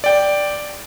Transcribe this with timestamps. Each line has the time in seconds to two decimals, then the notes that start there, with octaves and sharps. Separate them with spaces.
0.04 D5 G5